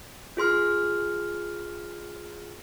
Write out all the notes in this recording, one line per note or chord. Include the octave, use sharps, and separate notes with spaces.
F4 G#4 C6 F6